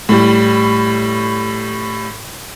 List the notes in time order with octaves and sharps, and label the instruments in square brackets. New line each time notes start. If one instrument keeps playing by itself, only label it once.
[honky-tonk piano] A2 G3